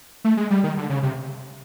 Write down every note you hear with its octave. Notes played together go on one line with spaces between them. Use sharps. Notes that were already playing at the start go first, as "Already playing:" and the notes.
A3
G#3
G3
D#3
D3
C#3
C3